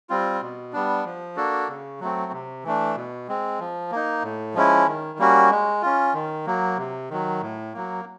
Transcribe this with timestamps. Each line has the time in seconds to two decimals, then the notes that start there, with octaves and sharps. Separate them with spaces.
0.10 G3 C4 F4
0.41 B2
0.73 G3 B3 D4
1.05 F3
1.36 A#3 D4 F#4 A4
1.68 C#3
2.00 F#3 A3 C4
2.32 C3
2.64 E3 A3 D4
2.96 B2
3.28 G#3 C4
3.59 F3
3.91 A#3 D#4
4.23 A2
4.54 F3 G#3 C#4 E4
4.87 D#3
5.19 G3 A#3 C#4 F#4
5.50 G#3
5.82 C#4 F4
6.14 D#3
6.46 F#3 A#3
6.77 C3
7.10 D#3 F#3
7.41 A2
7.73 F#3 A#3